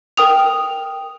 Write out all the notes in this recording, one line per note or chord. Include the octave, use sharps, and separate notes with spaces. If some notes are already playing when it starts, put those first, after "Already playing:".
A#4 G5 D#6 F7